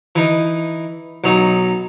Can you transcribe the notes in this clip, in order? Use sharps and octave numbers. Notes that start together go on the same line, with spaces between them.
E3 D#4
B1 F#3 D#4